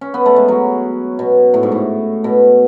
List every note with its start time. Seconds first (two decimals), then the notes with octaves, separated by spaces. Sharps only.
0.01 C#4
0.14 B3
0.26 A3
0.36 G#3
0.48 F#3
1.19 B2
1.54 A2
1.63 G#2
1.72 A2
2.24 B2